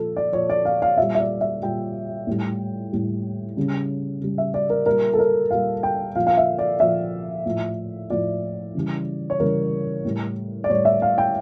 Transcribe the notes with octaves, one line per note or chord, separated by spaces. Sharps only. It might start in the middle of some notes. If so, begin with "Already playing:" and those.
Already playing: A#2 F3 A4
D5
A#2 F3 C#5
D5
F5
F5
A#2 G3 E5
E5
D5
E5
A#2 G3 G5
A2 G3
A2 G3
C#3 G3
C#3 G3
E5
D5
A#4
A#2 G3 A#4
A4
A#4
A#2 G3 F5
G5
A#2 F3 F5
F5
E5
D5
A#2 F3 E5
A2 F3
A2 F3 D5
C#3 E3 G3
C#5
C#3 E3 G3 A#4
A2 G3
D5
A2 G3 C#5
E5
F5
G5